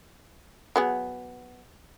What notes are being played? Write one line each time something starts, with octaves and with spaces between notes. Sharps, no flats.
F#3 B3 G#4